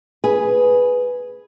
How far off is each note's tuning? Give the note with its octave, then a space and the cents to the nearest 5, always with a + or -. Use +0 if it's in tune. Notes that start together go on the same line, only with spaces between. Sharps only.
G#4 +0 B4 +0